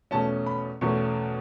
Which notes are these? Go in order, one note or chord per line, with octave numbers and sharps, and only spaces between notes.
E2 B2 A3 C#4 A5
B5
E2 B2 A3 C#4 C#6